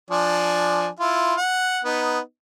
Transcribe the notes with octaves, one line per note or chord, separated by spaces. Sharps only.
F3 D4 G#5
E4 F4
F#5
B3 D#4